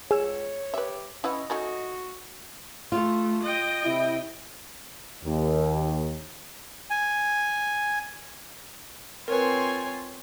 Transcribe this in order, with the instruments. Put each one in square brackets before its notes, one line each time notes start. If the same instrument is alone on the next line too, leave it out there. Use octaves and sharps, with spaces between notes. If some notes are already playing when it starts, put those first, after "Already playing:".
[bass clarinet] C#2 [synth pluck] G#4 E6 E7 [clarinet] C#5
[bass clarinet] G4 [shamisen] B4 E5
[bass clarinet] C#4 [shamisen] E4 B4 F#5 [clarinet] D#5
[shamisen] A3 C#4 D#4 [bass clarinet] F#4
[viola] A3 [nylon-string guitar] F4
[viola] D#5 G5
[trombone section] C3 E4
[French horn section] D#2
[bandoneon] G#5
[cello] C4 F4 [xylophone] A#4 B4 [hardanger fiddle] C#5 G#5